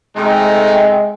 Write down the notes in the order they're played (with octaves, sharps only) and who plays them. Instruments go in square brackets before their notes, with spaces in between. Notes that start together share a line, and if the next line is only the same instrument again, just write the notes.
[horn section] C3 A3 D#4 [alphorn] G#3 [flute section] D#5 G5